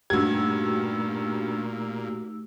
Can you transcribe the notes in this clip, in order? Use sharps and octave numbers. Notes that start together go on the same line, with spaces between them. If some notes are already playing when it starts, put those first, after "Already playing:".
G2 A#2 A3 D#4 F#4 G4 E6 G#6